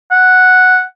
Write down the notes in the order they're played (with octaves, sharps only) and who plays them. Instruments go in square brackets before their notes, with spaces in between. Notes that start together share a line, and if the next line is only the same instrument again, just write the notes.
[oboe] F#5